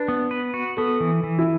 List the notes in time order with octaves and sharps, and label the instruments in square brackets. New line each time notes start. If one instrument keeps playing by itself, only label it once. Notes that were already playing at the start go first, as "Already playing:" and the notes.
Already playing: [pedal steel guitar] D4 [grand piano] B4
[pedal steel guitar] B3
B4
F#4
[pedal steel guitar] B3 [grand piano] A4
[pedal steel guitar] E3
E3
[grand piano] E4